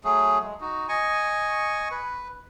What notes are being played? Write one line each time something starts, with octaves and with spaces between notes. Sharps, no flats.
F#3 A3 G#4
G#3
D#4 F#4
D#5 G#5 C#6
B4